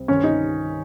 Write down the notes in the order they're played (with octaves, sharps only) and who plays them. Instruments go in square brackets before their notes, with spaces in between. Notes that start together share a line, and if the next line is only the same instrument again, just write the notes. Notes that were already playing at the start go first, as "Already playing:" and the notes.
Already playing: [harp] C2 C4
[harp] G2 D#3 A#3 F4 [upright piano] C#4
[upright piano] D#4